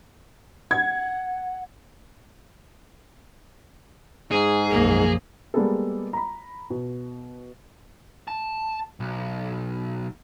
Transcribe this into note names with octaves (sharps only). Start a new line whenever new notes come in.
F#5 G#6
G#2 G#4
B1 F#2 F3 A#3
G3 G#3 A#3 B3 G#4 A4
A#5 B5
B2
A5
B1